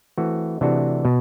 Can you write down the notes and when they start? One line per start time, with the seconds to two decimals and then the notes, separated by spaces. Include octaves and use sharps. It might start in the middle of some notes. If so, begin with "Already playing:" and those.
0.18 E3 A3 C4 F#4
0.61 C3 E3 A3 D4 F#4
1.05 B2